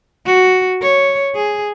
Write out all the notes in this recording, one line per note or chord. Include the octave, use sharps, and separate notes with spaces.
F#4
C#5
G#4